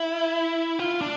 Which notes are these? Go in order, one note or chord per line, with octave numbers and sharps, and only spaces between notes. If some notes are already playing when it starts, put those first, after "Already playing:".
Already playing: E4
F4
D4